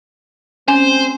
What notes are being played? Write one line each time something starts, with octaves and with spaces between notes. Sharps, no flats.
G3 A3 C4 C#4 C5 G#5